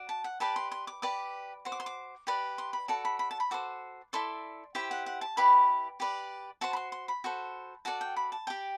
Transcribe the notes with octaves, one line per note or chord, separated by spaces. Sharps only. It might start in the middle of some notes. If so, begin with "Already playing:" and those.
Already playing: F#4 D5
A5
F#5
G4 B4 D5 A5
C6
C6
D6
G4 B4 D5 D6
F#4 C5
D6
C6
D6
G4 B4 D5
C6
B5
F#4 A4 D5 A5
B5
B5
A5
B5
F#4 A4 C5 D6
E4 A4 D5 C6
E4 G4 C5 G5
F#5
F#5
A5
E4 G4 B4 D5 B5
G4 B4 D5
F#4 C5 A5
B5
C6
C6
B5
F#4 A4 C5
F#4 A4 D5 A5
G5
B5
A5
G4 D5 G5